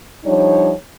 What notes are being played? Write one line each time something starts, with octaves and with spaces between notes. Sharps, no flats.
F3 G3 D4 D#4 C#5